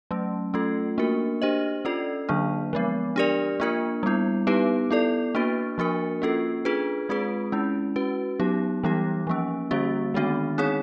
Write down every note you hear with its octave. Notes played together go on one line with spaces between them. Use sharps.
F#3 A3 C#4
A3 C#4 F4 A4
A#3 D4 F#4 A#4
D4 G4 C5 D#5
C#4 F4 A4 D5
D3 F#3 A#3 D4
F3 G#3 B3
D4 G4 A#4 D5
A#3 D4 F4 A#4
G3 B3 E4
B3 D#4 G4 B4
B3 E4 A4 D5
A#3 D4 F#4 B4
F3 A#3 D4 F#4 A#4
A#3 C#4 F4 A4
D4 F4 G#4 B4
G#3 C4 F4 G#4 B4
G#3 C#4 E4
C#4 F#4 B4
F#3 B3 D#4 G4
E3 G3 B3 D#4 G4
F3 A#3 C#4
D3 G3 A#3 C#4 F#4
D#3 G#3 B3 D4 F#4
C4 D#4 G#4 C#5